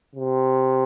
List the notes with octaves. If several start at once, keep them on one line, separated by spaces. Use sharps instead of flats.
C3